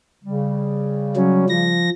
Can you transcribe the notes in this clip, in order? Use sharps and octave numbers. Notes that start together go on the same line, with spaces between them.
C#3 G3
F#3 C#4
F3 A#6